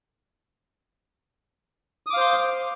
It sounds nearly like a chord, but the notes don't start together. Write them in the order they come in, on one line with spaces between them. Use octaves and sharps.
D#6 D6 F5 C5 C6